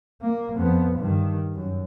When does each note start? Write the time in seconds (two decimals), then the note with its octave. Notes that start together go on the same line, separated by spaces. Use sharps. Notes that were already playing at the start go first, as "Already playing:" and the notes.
0.21 A#3
0.56 F2 B3
0.99 G2 D#3
1.54 F#2